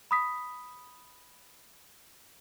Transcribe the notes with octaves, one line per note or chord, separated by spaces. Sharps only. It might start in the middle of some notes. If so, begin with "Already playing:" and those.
B5 D#6 B6